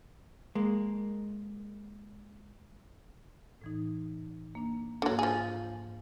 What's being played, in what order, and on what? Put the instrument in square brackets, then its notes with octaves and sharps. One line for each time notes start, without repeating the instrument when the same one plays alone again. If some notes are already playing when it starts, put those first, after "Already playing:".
[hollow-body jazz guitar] G#3 A#3
[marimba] A2 E3 D#4
A#3 D4
[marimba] G#2 A#3 [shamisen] D3 F#3
[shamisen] F3 G#4